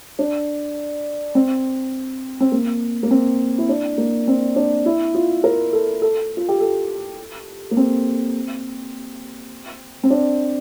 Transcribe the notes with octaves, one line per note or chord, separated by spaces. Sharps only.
D4
C4
C4
A#3
A#3
C4
E4
D4
A#3
C4
D4
E4
F4
A#4
A4
A4
F4
G4
A4
A#3
C4
C4
D4